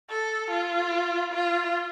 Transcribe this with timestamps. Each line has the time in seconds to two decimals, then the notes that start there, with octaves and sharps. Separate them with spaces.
0.10 A4
0.51 F4
1.32 F4